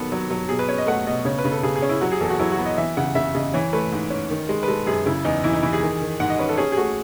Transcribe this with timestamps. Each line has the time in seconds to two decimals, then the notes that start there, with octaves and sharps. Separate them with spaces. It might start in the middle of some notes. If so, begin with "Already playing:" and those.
Already playing: D#3 F#3 B3 A4
0.12 F#3
0.31 F#3
0.49 B2 G#4
0.59 B4
0.68 C#4 C#5
0.78 D#5
0.87 A3 F#5
1.07 B2 D#5
1.25 C#3 C#5
1.38 B4
1.45 C#3
1.52 A4
1.63 C#3 G#4
1.76 G#4
1.82 C#4
1.89 E4
2.01 F#3 F#4
2.12 G#4
2.21 E2 A4
2.30 F#4
2.39 F#3 E4
2.52 F#4
2.59 B3
2.66 D#5
2.78 E3 E5
2.97 C#3 F#5
3.15 C#3 E5
3.35 C#3 D#5
3.53 E3 C#5
3.73 A3 B4
3.92 G#2
4.10 C#4
4.30 D#3
4.49 G#3
4.63 B4
4.68 G#3 A4
4.86 F#2 G#4
5.06 C#3 E4
5.25 E2 D#4
5.44 E3 E4
5.53 D#4
5.62 E3 E4
5.73 G#4
5.82 D#3
6.02 D#3
6.20 G#2 F#5
6.30 D#5
6.39 C#4 B4
6.49 A4
6.58 C#4 G#4
6.72 G#4
6.77 A3 F#4